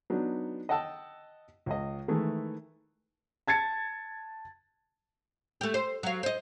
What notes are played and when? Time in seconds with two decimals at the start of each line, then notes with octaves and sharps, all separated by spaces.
0.10 F#3 B3 D4 D#4
0.69 D#5 F#5 G5 A5 E6
1.66 C#2 D#5
2.08 D#3 E3 G#3 A3
3.47 A5 G#6 A6 C#7
5.61 A3 G4
5.74 C5
6.03 F#3 F5
6.23 C5 D#5